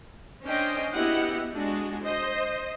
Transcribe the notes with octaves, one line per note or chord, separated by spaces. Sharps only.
C#4 D4 C5 D#5 G5
B3 E4 F#4 G4 D#5 F#5
G#3 D4 F#4
C5 D#5